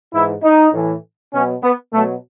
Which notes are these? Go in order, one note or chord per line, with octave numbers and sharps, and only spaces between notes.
G#2 E3 E4
D#4
A2 E3
B2 F#3 C#4
B3
B2 F#3 A3